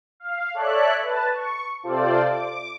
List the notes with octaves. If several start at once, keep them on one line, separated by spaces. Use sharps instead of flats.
F5
A4 C#5 D5 E5 F#6
B4 A5
C#6
C3 F4 A4 C5 D5
D6